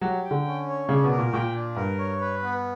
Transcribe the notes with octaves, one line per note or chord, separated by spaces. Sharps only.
F#3 G4
G5
D3
C#4
C#5
C#3 D4
B2
A#4
A#2
A#2 G5
D4
G2 A#4
C#5
B4
B3